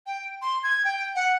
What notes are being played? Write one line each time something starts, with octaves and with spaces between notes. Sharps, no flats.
G5
C6
G#6
G5
F#5